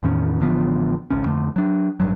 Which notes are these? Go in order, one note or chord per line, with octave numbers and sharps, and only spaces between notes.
E2 A2 D#3 C#4
A1 D3 F3 B3
G#1 C#2 C#4
F2 D3 A3
F#3 D4
A1 G2 F#3